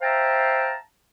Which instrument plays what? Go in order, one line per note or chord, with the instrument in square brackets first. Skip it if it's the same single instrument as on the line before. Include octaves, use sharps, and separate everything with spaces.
[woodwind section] C5 E5 F5 G5 A5 A#5